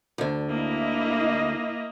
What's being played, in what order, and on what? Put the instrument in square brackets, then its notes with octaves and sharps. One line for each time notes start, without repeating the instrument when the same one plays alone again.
[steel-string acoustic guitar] D2 D3
[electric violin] A#3 [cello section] E4 D#5